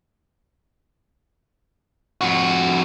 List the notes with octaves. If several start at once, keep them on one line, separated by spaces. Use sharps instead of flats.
F2 F#4